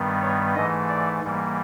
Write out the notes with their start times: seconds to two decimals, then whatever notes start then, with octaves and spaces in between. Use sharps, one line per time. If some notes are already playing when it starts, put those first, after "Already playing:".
Already playing: G2 D#3 G3 B3
0.22 C#5
0.56 G#2 E3 A3 D#5
0.89 D5
1.24 G#2 E3 G3 A#3